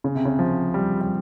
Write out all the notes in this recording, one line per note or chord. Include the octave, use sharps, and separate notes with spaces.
C#3
C3
C#3
F3
G3
G3